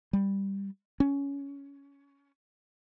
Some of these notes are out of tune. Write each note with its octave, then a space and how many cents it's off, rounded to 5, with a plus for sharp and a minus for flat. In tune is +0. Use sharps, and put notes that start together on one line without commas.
G3 +5
C#4 +15